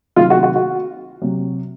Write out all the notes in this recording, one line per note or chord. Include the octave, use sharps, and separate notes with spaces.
C3 D#3 F#3 F4
F#4
F#4
F#4
C3 F#3